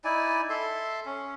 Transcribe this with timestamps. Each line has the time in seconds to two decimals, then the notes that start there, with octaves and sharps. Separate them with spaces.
0.04 D#4 E4 D5 G#5
0.50 A4 E5 C6
1.06 C#4